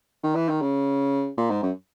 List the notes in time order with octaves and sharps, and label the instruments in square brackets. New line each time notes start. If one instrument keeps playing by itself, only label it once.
[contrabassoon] D#3
E3
D#3
C#3
A#2
G#2
F#2